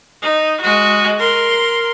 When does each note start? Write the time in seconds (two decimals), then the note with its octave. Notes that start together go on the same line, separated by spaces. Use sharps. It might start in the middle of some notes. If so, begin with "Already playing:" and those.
0.22 D#4
0.61 G#3 F#4
1.19 A#4 C6